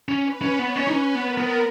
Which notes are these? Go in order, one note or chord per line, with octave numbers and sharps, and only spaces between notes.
C#4
B4
C#4
B3 C#5
C#4
D#4
C#4 B4
B3
A#4
B3